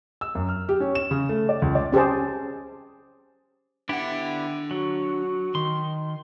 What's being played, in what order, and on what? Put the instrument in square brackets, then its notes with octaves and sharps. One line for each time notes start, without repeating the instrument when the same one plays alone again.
[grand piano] E6
F#2
F6
G4
C#4
E7
C#3
A3
D5
C#2
D5
[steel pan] C#4 G4 G#4 C5 A5
[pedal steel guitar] B3 E4 G4 [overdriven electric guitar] D4 F#5
[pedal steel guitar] F#3 [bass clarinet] F#4
[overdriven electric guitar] D#3 [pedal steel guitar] C6